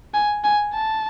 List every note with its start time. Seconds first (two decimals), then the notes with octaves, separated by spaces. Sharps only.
0.14 G#5
0.44 G#5
0.73 A5